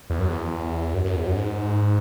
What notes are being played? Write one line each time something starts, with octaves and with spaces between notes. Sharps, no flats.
E2
F#2
E2
F#2
F#2
E2
F#2
G#2